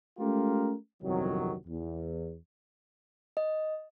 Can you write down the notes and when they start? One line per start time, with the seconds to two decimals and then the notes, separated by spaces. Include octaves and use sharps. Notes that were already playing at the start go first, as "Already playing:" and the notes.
0.19 G#3 A3 C#4 F4 G4 A#4
1.03 G1 C2 F2 D#3 F#3
1.68 E2
3.37 D#5